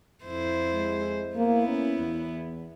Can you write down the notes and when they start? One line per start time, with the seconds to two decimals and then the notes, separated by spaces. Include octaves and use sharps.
0.24 F2 E4 C5
0.73 G#3
1.36 A#3 B3 E4
1.68 C#4
1.98 E2